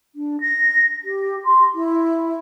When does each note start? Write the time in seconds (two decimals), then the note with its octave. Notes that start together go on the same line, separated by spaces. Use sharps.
0.15 D4
0.41 A#6
1.04 G4
1.44 C6
1.74 E4